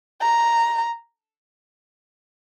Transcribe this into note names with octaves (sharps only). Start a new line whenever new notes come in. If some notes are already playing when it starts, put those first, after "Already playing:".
A#5